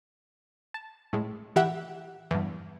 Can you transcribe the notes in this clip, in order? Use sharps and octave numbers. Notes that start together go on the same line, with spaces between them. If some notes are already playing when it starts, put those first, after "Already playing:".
A5
A2 G#3
E3 G4 E5 F#5
E2 G2